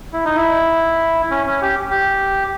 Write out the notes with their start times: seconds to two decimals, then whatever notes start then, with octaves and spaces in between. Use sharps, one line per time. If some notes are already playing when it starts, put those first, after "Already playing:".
0.13 E4
0.25 D#4
0.36 E4
1.31 C#4
1.47 C#4
1.62 G4
1.90 G4